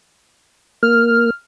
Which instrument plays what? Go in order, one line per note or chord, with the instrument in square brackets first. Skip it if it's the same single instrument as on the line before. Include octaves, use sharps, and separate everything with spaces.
[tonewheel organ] A#3 [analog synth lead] F6